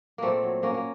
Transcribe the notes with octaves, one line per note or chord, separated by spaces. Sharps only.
A#2 A3 A#3 C4
F#3
F#3 A#3 C#4
A#3